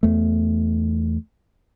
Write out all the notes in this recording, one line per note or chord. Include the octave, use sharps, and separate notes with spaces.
E2 A3